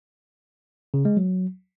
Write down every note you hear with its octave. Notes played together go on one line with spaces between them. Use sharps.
C#3
G#3
F#3